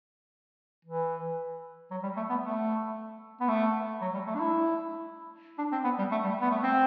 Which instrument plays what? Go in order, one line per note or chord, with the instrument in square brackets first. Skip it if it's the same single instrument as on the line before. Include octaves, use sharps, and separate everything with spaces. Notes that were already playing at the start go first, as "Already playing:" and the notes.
[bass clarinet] E3
F#3
G3
A3
B3
A3
B3
A3
F#3
G3
A3
D4
E4
D4
C4
B3
G3
A3
G3
B3
A3
C4